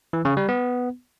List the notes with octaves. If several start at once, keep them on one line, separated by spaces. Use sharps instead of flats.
E3
C#3
G3
B3